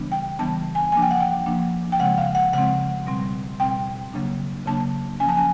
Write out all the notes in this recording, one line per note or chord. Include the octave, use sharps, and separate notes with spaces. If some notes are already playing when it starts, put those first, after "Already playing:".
Already playing: C#3 E3 G3 B3 D4
G5
C#3 E3 G3 B3 D4 A5
G#5
F3 A#3 D4 G#5
G5
F#5
G5
F3 A#3 D4
G5
C#3 F3 G#3 C4 F#5
F5
F#5
C#3 F3 G#3 C4 F#5
B2 G3 C4
B2 G3 C4 G5
C#3 F#3 A#3 D4
C#3 F#3 A#3 D4 A5
F3 A#3 C#4 G#5
A5
G#5